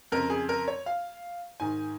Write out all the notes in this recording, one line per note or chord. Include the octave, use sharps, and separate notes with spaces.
F2 C#3 A#4
G#4
A#4
C#5
F5
G#2 D#3 G#5